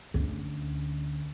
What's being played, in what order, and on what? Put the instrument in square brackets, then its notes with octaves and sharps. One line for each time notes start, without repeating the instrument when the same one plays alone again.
[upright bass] D2 C#4